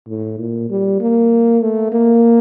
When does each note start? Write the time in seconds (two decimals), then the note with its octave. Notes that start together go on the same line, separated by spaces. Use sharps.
0.08 A2
0.38 A#2
0.70 G3
1.00 A#3
1.62 A3
1.92 A#3